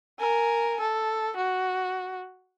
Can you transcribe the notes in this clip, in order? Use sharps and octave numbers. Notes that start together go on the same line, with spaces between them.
A#4 G#5
A4
F#4